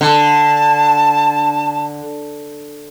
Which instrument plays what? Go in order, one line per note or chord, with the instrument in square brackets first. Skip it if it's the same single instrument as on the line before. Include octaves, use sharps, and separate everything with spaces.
[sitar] D3 [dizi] A5